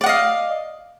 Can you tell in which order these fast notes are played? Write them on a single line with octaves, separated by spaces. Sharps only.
D5 F#5 D#5 F5